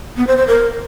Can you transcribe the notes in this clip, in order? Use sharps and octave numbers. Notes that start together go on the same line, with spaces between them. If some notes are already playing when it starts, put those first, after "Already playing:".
B3
C5
C5
A#4